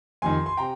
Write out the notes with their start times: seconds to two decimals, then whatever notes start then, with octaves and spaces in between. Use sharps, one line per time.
0.22 F2 C3 D#3 G#5 C6
0.46 C6
0.57 C3 G5 A#5